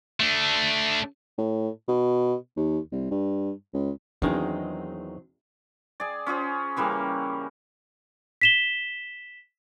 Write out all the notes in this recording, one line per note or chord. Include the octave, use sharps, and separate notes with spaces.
A3 D4
A2
B2
D#2
C2
G2
C#2
E2 D#3 F#3 G#3 C4 D4 D#4
G#4 D5
C#4 F4 G#4 C5
C#3 E3 G3 A#3
B6 E7 G7